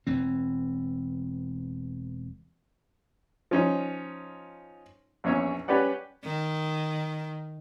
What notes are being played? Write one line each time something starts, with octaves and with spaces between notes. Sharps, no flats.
E1 E3 C4
F3 C#4 D#4
A#1 E2 C#4 C#5
C#4 G4 B4 D5 F#5
D#3